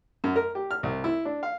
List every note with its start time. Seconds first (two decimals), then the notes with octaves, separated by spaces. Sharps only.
0.24 F#2
0.36 A#4
0.55 G4
0.71 F6
0.83 C2
1.04 E4
1.25 D4
1.43 F5